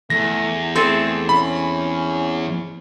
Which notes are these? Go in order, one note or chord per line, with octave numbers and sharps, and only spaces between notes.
E2 A3 A#6
A3 C4 G#4 A4
C#4 B5